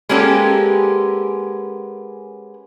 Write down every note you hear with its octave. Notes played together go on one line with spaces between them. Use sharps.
G#3 A#3 B3 C#4 G4 A4